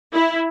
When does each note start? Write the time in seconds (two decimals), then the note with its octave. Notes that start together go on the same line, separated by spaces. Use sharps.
0.13 E4